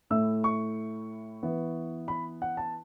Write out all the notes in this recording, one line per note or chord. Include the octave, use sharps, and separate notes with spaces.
A2 A3 E4 E6
C#6
E3 B3 E4
B5
F#5
A5